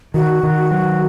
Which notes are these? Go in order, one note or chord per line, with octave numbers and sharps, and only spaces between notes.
D#3 F#4
D#3
F#3